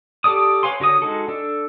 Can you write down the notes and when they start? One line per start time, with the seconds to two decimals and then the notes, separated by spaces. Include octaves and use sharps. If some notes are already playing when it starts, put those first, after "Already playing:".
0.24 G4 A4 D5 D#6
0.63 B4 C#5 F5 G#5 C6
0.80 D3 F#4 C#5 D#6
1.02 G#3 D#4 F#4 A4
1.28 D4 A4